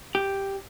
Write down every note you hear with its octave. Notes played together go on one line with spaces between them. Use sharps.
G4